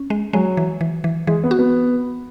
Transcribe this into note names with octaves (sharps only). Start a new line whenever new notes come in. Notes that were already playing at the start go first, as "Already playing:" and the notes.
Already playing: C#4
G#3
F#3 G#3
E3
E3
E3
E3 G#3
B3
F#4
B3